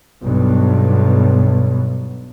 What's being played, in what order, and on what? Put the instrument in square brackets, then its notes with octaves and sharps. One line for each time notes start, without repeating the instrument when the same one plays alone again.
[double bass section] B1 G2 B2